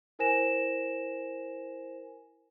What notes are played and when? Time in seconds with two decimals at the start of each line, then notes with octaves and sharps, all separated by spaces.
0.19 E4 A#4 C5 G#5 A#6 E7